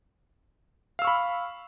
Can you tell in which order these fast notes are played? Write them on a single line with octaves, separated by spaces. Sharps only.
F5 E6 C#6 B5